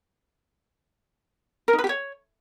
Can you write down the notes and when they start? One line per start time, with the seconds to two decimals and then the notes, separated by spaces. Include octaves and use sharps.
1.68 A#4
1.73 D#4
1.79 B4
1.84 G4
1.89 C#5